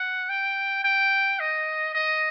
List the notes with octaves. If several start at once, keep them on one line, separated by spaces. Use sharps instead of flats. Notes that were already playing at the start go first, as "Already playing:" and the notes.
Already playing: F#5
G5
G5
D#5
D#5